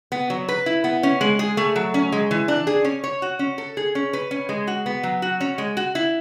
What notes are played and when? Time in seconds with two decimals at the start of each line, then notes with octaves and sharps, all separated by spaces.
0.12 B3
0.30 F#3
0.48 B4
0.66 E4
0.84 B3
1.03 C#4
1.21 G#3
1.39 G#4
1.57 A3
1.76 F#3
1.94 C#4
2.12 G#3
2.31 E3
2.48 D4
2.67 G#4
2.85 C#4
3.04 C#5
3.22 F#4
3.39 C#4
3.58 A4
3.77 G#4
3.95 C#4
4.13 B4
4.31 C#4
4.49 G#3
4.67 F#4
4.86 B3
5.03 F#3
5.22 F#4
5.40 C#4
5.58 G#3
5.77 F#4
5.95 E4